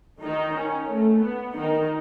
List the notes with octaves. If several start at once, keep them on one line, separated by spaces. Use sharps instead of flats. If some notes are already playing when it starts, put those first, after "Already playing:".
D#3 D#4
C#4
A3
B3
D#3 D#4